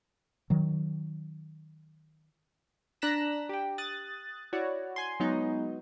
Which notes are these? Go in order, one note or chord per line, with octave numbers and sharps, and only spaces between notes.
D#3 F#3
D4 A#5 F#6 A#6 B6 E7
G4 G5
D#6 F#6 A6
E4 F#4 C#5 D5
G#5 C6
F#3 G#3 B3 D#4